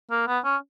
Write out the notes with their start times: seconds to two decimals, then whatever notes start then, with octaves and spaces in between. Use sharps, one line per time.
0.11 A#3
0.27 B3
0.44 C#4